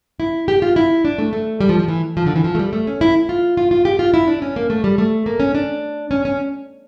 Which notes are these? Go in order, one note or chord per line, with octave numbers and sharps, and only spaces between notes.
E4
G4
F4
E4
D4
A3
A3
G3
F3
F3
E3
F3
D3
E3
F3
A3
G3
A3
C#4
E4
F4
F4
F4
G4
F4
E4
D4
C#4
A#3
A3
G3
A3
A#3
C#4
D4
C#4
C#4